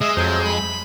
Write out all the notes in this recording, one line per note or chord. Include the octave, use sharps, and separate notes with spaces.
G#3 D#5 E5
F2 F#3 C5
B5